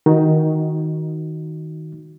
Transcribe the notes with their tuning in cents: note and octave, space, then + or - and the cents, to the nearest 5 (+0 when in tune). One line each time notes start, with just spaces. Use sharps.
D#3 +15 D#4 -5 F#4 +0